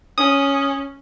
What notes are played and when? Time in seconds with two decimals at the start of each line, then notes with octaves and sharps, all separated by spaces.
0.18 C#4 D#6